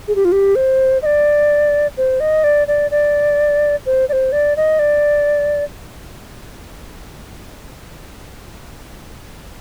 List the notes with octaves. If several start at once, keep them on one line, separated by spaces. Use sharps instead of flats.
G#4
G4
F4
G4
C5
D#5
D5
C5
D#5
D5
D5
D5
C5
D5
C5
D5
D#5
D5